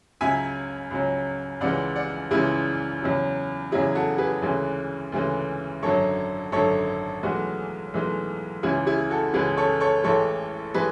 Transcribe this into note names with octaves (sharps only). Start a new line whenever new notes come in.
C#2 C#3 F#3 E5 G#5
C#2 C#3 F#3
C#2 C#3 E3 G#3 D5 F#5
D5 F#5
C#2 C#3 E3 G#3 E4 G#4
E2 C#3 F#3
E2 C#3 F#3 E4 G#4
F#4 A4
G#4 B4
D2 C#3 E3 G#3
D2 C#3 E3 G#3
G#1 F#2 D3 F#3 A4 C#5
G#1 F#2 D3 F#3 A4 C#5
B1 A2 E3 G#3 F#4
B1 A2 E3 G#3
C#2 C#3 E3 G#3 E4 G#4
E4 G#4
F#4 A4
C#2 C#3 E3 G#3 G#4 B4
A4 C#5
A4 C#5
A1 A2 E3 G#3 A4 C#5
A2 E3 G#3 G#4 B4